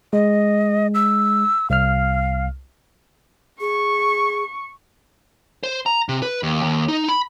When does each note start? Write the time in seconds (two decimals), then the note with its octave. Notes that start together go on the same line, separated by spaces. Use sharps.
0.13 G#3 D#5
0.94 E6
1.70 C2 F5 F6
3.60 G#4 C#6
5.63 C5
5.86 A#5
6.09 C3
6.22 B4
6.43 D#2
6.63 D#2
6.88 D#4
7.09 B5